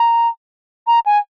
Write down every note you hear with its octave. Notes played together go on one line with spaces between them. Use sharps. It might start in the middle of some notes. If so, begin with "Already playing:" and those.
Already playing: A#5
A#5
G#5